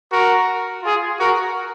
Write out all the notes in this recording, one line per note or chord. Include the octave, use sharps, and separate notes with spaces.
F#4 A#4
F4 G#4
F#4 A#4